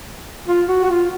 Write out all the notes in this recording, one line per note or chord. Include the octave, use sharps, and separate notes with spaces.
F4
F#4
F#4
F4